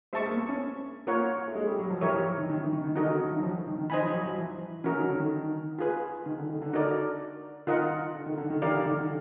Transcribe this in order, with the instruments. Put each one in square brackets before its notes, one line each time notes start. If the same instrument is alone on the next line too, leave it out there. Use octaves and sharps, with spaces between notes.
[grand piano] G#3 [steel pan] C5 E5 A5 C#6
[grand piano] A#3
B3
C#4
[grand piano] A#3 [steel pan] F4 A#4 C#5 F#5
[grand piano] A3
G#3
G3
F#3
F3
[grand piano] E3 [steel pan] G4 A#4 C#5 E5
[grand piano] F3
D#3
D#3
E3
D#3
D#3
[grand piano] D3 [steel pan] D#4 F#4 A#4 D#5
[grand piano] D#3
D#3
E3
F#3
F3
D#3
D#3
[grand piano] E3 [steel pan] C5 D#5 G#5 B5
[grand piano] F3
F#3
F3
E3
[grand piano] E3 [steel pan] C#4 F#4 A#4
[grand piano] D#3
D3
D#3
[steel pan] F4 G#4 B4
[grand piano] D#3
D3
D#3
D3
[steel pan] D#4 F#4 A#4 D5
[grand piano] D#3 [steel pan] F4 A#4 D#5 F#5
[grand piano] D3
D#3
D3
D#3
[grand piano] E3 [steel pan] G4 A#4 D5 F5
[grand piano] D3
D#3
D3